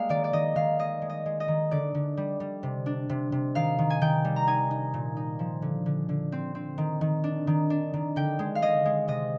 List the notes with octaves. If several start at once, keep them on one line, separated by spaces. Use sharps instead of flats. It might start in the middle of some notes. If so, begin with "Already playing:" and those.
Already playing: G3 G#3 A#3 F5
D#3 D5
D5
D#3 D#5
D#3 F5
G#3 D#5
G#3
D#5
G#3
D#5
D#3
D3 D5
D3
G3
G3
C3
D4
C3
C3
D#3 F5
D#3
G#5
D#3 G5
G3
A#5
D#4 G#5
D#4
A#2
D#4
F3
D3
D3
D3
C4
C4
D#3
D#3
D4
D#3
D4
D#3
D3 G5
G#3
F5
G#3 D#5
G#3
C3 D#5